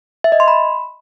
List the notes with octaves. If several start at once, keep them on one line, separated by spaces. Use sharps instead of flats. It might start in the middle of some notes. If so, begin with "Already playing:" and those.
E5
D#5
C6
B5